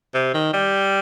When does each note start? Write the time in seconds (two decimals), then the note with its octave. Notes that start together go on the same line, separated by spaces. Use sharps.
0.14 C3
0.34 D#3
0.53 G3